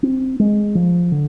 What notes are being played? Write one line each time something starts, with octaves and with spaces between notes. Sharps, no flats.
C4
G#3
F3
D3